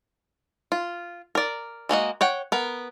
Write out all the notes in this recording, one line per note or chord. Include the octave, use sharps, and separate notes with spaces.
F4
A#4 D5
G#3 A#3 F#4 D#5
C#5 F#5 G5
B3 A#4